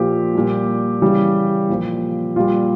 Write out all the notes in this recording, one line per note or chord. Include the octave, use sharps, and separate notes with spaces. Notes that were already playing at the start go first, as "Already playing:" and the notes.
Already playing: A#2 F3 G4
A#2 G3
C#3 E3 G3
A#2 F3
A#2 G3 F4